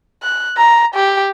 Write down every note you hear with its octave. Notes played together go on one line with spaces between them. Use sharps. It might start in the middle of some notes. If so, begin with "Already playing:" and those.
F#6
A#5
G4